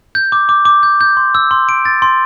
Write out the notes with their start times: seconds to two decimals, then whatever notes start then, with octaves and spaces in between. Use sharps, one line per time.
0.15 G6
0.32 D6
0.49 D6
0.65 D6
0.83 G6
1.01 G6
1.17 C6
1.35 E6
1.51 C6
1.69 D7
1.85 A6
2.02 C6